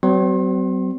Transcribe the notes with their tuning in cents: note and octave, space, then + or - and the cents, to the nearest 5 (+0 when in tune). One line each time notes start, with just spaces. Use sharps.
F#3 +40 C4 -40 C6 +35